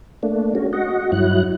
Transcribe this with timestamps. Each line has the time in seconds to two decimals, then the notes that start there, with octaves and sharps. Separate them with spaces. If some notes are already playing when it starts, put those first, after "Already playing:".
0.23 A3 A#3 D4
0.55 G#3 C#4 F#4
0.73 F#4 D#5 F#5
1.12 G2 F#3 E4 F#6